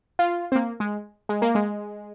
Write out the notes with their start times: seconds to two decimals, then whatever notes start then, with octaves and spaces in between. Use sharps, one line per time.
0.19 F4
0.52 C4
0.55 A#3
0.80 G#3
1.29 G#3
1.42 A#3
1.55 G#3